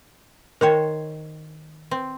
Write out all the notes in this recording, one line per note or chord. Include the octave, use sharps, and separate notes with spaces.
D#3 A#4 C5 C#5 G5
C4